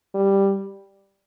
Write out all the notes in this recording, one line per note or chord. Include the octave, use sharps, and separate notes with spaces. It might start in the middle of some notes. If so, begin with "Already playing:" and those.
G3